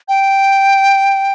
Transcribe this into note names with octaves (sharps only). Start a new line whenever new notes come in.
G5